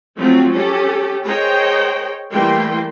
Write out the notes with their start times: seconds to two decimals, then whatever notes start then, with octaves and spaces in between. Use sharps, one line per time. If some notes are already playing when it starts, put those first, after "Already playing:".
0.17 F3 F#3 A3 C4 F4
0.52 C#4 G4 A4
1.24 G#4 A#4 C5 C#5 D#5 G5
2.32 E3 G3 A3 A#3 G5 C6